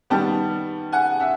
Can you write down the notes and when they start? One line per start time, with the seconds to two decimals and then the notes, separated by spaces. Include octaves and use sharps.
0.10 D#3 G3 B3 G5 A5
0.92 F#5 G#5
1.20 E5 F#5